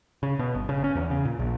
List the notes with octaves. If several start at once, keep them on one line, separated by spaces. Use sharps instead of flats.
C#3
B2
G1
C#3
C#4
E2
C#3
A#2
A#1